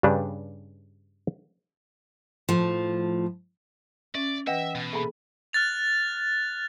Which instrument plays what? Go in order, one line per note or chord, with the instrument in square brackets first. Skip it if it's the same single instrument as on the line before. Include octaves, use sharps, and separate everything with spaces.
[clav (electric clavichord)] G2 C#3 G3 D4 B4
[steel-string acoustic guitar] A2 F3
[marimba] C#4 [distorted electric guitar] D5 [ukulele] E5
[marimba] E3 B4 [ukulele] D#5 F#5 G5 [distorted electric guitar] E5
[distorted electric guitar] B2
[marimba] A#3 G#4 A4 [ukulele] E5 G#5 B5
[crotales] F6 F#6 A6 F7